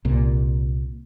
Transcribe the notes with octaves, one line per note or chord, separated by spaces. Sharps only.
C2 A#2